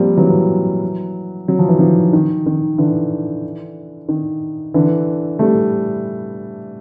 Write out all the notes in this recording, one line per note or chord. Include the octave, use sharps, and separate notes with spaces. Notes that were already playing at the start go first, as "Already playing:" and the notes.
Already playing: F3 G3 A#3 C4
E3 F#3
F#3
F3
E3
D#3 F3
D#3
D#3
D3 E3
D#3
D3 E3
G3 A3